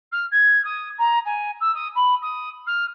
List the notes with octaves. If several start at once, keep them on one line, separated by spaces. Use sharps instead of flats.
F6
G#6
D#6
A#5
G#5
E6
D#6
B5
D#6
F6